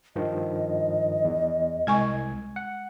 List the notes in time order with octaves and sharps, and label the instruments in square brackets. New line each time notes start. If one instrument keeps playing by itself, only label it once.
[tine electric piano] G2 D#3 F3 [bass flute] D#5
[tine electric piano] E2
[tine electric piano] C2 G#6 [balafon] G#3 G#5 C#6
[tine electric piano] F#5